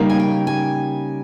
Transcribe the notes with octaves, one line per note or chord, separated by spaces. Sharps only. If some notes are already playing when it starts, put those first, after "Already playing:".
Already playing: C#3 G3 A#3 D#4
G#5
G5
G#5